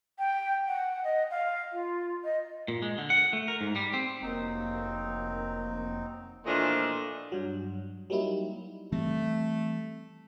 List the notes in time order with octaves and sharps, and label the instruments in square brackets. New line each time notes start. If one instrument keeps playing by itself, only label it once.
[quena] G5
F#5
D#5
F5
F4
D#5
[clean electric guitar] A#2
G#3
D3
F#5
A3
A#4
G#2
G3
C4
[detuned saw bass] F1 [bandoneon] F#3 C4 D#4 [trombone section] A#3
[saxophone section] A#2 E3 F3 A3 D4 D#5
[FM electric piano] G2 F#3
F#3 G3 A#3 D#4 E4
[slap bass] E3 G3 C4 [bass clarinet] A3